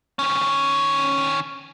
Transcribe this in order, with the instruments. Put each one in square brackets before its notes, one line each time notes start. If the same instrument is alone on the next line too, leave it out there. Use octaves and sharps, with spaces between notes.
[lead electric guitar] D#3 C#4